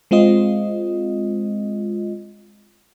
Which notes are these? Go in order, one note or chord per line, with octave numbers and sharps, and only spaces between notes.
G#3 C4 F4 D#5